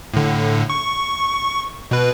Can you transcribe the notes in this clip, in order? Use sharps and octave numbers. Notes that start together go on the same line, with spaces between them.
A2 D3
C#6
B2 B4